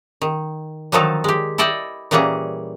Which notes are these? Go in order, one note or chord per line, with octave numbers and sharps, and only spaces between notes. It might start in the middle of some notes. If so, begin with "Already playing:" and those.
D#3
D3 D#3 F3 F#3 D#4 A4
G#3 G4
E4 A4 D5 D#5 G5
A#2 E3 G3 A#3 C#4 G#4